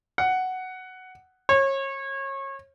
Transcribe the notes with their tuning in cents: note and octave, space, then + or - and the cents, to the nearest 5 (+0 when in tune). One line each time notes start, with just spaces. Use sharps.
F#5 +5
C#5 -30